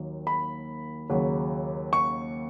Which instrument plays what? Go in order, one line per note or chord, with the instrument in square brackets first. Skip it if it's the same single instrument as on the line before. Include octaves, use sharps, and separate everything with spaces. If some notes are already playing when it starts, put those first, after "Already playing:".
Already playing: [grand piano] D#2 D#3 F#3
B5
D#2 C#3 F#3
C#6